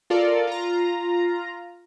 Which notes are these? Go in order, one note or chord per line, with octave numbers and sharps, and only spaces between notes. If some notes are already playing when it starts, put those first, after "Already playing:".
F4 A4 A#4 D5
F4 A#5